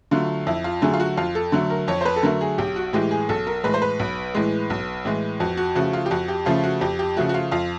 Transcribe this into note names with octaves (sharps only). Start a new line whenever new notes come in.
D3 F#3 A3 F4
F2 E4
F4
D3 F#3 A3 G#4
F4
F#4
F2 F4
A4
D3 F#3 A3
A#4
F2 C#5
C5
B4
A4
D3 F#3 A3 A#4
G#4
B1 G4
F#4
A2 E3 G#3 G4
G#4
B1 A4
A#4
A2 E3 G#3 B4
C5
B4
B1
A2 E3 G#3
B1
A2 E3 G#3
F2 F#4
F#4
C#3 F3 A3 F#4
F4
G4
F2 F#4
G4
C#3 F3 A3 F4
F#4
F2 G4
G4
C#3 F3 A3 F#4
F#4
F4
F2 F4